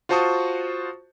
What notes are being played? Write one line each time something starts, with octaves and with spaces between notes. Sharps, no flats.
F4 F#4 C5 A5 C#6 D#6